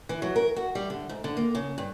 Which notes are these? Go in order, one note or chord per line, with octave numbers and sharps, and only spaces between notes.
E3
F#3
A#4
F#4
G3
D3
G#2
D3
A#3
C#3
G2